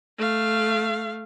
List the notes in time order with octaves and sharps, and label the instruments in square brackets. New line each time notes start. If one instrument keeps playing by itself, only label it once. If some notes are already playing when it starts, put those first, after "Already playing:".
[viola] A3 F5